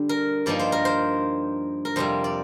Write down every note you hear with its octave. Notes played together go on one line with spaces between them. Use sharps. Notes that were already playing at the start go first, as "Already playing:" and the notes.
Already playing: D3 G3
A#4
G2 F3 A#3 D#4 D5
C5
A#4
C5
A#4
F2 C3 G3 C5
D5